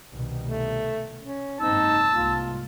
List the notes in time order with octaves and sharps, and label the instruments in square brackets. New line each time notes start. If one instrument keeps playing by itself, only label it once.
[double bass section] C2 B2 D#3
[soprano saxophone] A3
C#4
[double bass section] F#1 G#2 C4 [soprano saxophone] D#4 [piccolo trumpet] A5 [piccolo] E6
[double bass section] C2 G#2 A#3 [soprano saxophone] F4